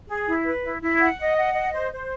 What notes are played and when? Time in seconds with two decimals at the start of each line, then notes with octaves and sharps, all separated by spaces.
0.08 G#4
0.27 E4
0.45 B4
0.63 E4
0.81 E4
1.00 F#5
1.19 D#5
1.36 F#5
1.55 D#5
1.74 C5
1.92 C5